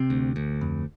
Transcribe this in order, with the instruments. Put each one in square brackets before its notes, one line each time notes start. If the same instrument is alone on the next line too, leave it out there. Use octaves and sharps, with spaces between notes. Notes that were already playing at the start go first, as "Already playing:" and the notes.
Already playing: [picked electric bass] C3 C4
D2
D2
F2